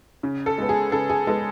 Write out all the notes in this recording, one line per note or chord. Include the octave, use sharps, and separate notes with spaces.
C#3
A4
G#3 B3
G#4
C#3 A4
G#4
G#3 B3 A4